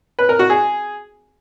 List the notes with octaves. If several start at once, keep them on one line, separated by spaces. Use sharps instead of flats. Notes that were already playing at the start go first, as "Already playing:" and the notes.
B4
A#4
F#4
G#4